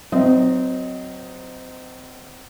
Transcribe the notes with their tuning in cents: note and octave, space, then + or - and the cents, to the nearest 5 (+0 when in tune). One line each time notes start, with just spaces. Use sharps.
F#3 +0 C4 -25 D#5 +0